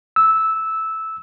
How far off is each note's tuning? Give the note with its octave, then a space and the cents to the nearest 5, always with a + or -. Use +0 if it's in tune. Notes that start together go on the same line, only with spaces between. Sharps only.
E6 -10